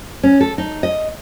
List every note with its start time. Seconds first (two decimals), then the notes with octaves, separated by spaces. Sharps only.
0.23 C#4
0.41 A4
0.58 D#4
0.83 D#5